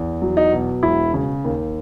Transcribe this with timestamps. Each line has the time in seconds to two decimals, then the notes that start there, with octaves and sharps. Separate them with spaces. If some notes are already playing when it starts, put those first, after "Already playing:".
Already playing: E2
0.22 F#3
0.37 D#4
0.53 B2
0.83 E1 E4
1.14 C#3
1.44 D#2